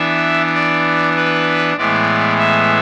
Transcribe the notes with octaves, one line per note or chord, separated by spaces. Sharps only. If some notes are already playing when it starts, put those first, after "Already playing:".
Already playing: E3 B3 D4 E5
D5
B4
A2 E3 G#3 B3 D5
E5